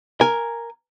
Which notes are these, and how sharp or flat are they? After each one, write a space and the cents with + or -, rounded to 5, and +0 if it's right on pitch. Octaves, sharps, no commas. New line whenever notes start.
A#4 +0 G#5 +0